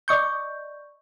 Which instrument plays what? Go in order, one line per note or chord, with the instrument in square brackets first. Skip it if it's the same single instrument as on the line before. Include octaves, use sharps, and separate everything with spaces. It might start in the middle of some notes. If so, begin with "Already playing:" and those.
[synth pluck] D5 D#5 C#6 G6